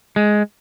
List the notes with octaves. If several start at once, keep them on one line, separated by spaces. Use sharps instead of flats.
G#3